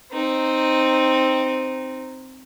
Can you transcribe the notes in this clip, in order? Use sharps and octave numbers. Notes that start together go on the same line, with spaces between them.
C4 D#4